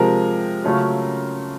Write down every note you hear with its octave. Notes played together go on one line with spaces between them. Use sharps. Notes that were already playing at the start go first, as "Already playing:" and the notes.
Already playing: C3 F3 G#3 A#4
C#3 F#3 A3 C#4 F4